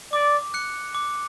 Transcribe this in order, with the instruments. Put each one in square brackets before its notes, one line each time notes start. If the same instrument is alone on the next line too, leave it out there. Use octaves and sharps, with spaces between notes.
[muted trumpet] D5 [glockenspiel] D6
[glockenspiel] F#6 C#7
D6